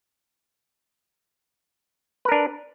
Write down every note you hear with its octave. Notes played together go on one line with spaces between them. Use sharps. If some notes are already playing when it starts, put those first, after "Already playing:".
D4 A#4 B4